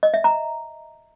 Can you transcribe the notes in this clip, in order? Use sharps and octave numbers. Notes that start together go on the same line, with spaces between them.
D#5
E5
A#5